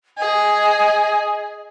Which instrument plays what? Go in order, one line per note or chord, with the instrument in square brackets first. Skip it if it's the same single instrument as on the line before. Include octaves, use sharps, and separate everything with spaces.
[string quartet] G#4 [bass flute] D#5